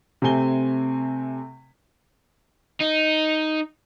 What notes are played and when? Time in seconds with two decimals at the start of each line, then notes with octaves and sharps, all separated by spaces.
0.22 C3 A3 C4 G#5 G7
2.80 D#4